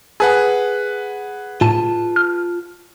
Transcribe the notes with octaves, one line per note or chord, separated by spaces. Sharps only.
G#4 B4 F#5 G#5 A5 D#6
A2 F4 A5 D#7
F6